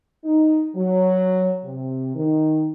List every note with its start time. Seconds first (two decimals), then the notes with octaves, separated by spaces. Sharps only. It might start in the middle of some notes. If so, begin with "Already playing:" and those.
0.24 D#4
0.75 F#3
1.64 C3
2.15 D#3